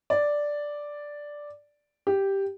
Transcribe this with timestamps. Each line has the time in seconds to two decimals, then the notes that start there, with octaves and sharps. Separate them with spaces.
0.10 D5
2.07 G4